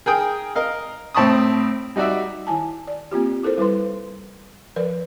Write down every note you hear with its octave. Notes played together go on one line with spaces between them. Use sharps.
G#4 A#4 G5 D#6
A#4 D#5 F5
A2 C4 A5 B5 C#6 D#6
G3 D#4 F#4 D5 E5
D#3 E4 G#5 A5
D5
A#3 C4 F4 G4
E4 A4 A#4 C5
G3 E4 B4 C6
F3 A#4 B4 D5